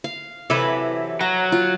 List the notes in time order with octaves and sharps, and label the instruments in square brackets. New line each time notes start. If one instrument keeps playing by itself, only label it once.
[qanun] F5
[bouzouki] C3 E3 F#3 [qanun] A4 B4
[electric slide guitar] F#3 [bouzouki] A#5
[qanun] F4